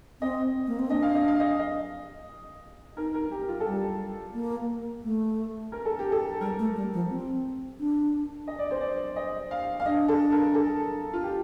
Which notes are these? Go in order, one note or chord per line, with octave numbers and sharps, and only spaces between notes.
C4 D#5
A#3
C4
D4 D#5
F5
D#5
F5
D#5
D#5
D#4 A#4
A#4
G4
F4
A4
G3 G4
A#3
A3
A#4
A4
G4
A4
G3 A#4
A3
G3
F3
C4
D4
D#5
D5
C5
D5
D#5
F5
F5
D4 D#5
A4
A#4
A4
F4
G4